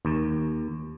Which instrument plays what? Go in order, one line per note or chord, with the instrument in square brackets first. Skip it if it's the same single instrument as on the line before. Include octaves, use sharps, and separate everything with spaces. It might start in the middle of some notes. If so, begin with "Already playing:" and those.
[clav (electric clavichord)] D#2